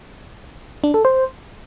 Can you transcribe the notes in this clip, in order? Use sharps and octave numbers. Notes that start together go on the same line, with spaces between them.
D4
A4
C5